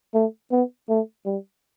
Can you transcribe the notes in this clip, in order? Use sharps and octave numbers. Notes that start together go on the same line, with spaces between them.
A3
B3
A3
G3